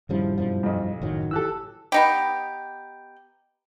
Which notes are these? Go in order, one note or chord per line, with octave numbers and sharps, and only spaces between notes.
D#1 G2 C#3 F3 G3 E4
F#2 B2 F3
B1 F2
F#1 A2 D#3 F#3 D#4
E3 G4 A4 E6 F#6
B3 D#4 G4